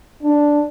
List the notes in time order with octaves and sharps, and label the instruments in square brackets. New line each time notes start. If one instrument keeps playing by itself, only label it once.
[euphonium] D4